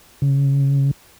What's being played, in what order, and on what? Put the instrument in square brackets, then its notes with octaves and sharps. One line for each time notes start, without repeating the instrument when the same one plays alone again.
[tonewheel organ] C#3